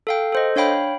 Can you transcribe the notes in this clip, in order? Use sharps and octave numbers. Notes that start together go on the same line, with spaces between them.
A4 F5 G5
A4 C5 D#5
D4 C#5 F5 G5 B5